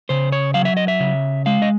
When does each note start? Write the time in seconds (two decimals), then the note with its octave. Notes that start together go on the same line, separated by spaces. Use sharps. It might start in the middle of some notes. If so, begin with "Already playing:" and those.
0.09 C#3 C5
0.32 C#5
0.54 F#3 F5
0.65 E5
0.77 D#5
0.88 E5
1.00 C#3
1.46 G#3 F5
1.62 D#5